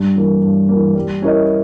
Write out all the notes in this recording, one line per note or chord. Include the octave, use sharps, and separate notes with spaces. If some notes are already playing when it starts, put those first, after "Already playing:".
Already playing: G2
E3 A#3
G2
E3 A#3
G3
C#4 E4 A#4 D#5